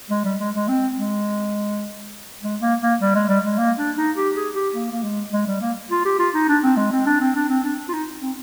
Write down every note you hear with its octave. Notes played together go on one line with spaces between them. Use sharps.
G#3
G3
G#3
G#3
C4
G#3
G#3
A#3
A#3
G3
G#3
G3
G#3
A#3
D4
D#4
G4
G#4
G4
A#3
A#3
G#3
G#3
G3
A#3
F4
G4
F4
D#4
D4
C4
G#3
C4
D4
C4
D4
C4
D4
F4
D#4
C4